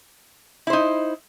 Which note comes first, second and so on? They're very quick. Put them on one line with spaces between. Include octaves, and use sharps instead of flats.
E4 C5 D#4